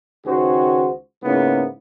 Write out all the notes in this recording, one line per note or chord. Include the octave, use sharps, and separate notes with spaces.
C#2 D#3 F#4 G#4 C5
G#2 C#3 A#3 B3 E4